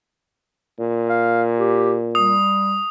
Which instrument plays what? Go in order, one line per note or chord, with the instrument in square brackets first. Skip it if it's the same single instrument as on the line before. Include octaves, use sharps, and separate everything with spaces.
[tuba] A#2
[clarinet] F5
G4
[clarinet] G3 [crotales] D#6